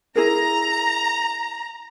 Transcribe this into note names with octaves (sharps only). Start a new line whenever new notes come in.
E4 G#4 A#4 A#5